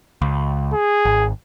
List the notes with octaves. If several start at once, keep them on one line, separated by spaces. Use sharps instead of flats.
C#2
G#4
G#1